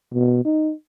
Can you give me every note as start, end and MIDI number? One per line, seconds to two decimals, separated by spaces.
0.14 0.42 47
0.45 0.72 63